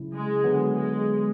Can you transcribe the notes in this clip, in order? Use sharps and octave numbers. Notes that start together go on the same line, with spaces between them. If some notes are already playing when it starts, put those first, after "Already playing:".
Already playing: C#3 F#3 C#4 E4
G#3
D3 F#3 B3
G#3